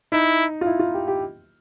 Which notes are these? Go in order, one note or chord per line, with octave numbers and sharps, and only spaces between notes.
D#4 E4
F4
E4
F4
G4
G4